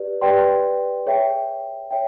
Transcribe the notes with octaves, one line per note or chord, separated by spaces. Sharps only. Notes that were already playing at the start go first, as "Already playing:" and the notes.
Already playing: G4 B4 D5
G4 B4 D5 G5 C6
G#4 C#5 E5 G5
C#5 E5 G5